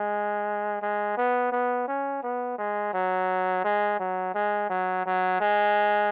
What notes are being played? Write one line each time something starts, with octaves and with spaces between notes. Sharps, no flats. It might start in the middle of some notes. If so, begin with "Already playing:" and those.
Already playing: G#3
G#3
B3
B3
C#4
B3
G#3
F#3
G#3
F#3
G#3
F#3
F#3
G#3